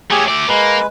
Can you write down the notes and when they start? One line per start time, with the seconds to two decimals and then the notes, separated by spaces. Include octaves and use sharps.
0.11 A3 C#4 G4 G#4
0.28 A3 D5 D6
0.48 G#3 A#3 B4